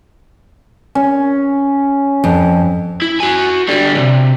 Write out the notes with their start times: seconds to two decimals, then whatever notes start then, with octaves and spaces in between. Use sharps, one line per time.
0.95 C#4
2.24 F2
3.02 E4
3.20 F#4 G#5
3.68 D3 G3
3.95 B1 C3